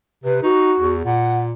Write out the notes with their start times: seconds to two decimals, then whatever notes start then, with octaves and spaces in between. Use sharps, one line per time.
0.24 C3 B4
0.43 D#4 F#4
0.80 E2
1.05 A#2 F#5